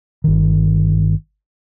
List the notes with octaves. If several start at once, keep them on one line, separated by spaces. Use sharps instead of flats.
G1 D#3